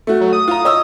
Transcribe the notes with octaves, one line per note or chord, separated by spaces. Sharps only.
A3 F#4
F#3
D#6
F4 A#5
C#5 D#5 E6